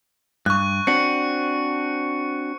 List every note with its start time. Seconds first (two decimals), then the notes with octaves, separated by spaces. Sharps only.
0.46 G2 C#6 F#6
0.87 C4 D4 F#4 C#7